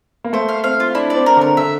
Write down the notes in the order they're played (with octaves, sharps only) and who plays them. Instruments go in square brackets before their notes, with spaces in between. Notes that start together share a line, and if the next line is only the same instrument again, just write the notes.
[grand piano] A#3
[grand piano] A3 [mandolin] C5
[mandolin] F5
[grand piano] C4 [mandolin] F5
[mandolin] F4
[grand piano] D4 [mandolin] E4
[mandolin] D5
[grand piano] C4
[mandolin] A#4
[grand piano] D3
[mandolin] A#4
[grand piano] D3 [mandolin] E5